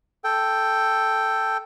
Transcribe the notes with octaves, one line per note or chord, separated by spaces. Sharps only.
A4 G5